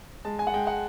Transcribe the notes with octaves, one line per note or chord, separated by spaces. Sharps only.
G#3 A5
G#5
F#5
G#3 G5
F#5